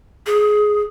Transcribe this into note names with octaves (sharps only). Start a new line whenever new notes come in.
G#4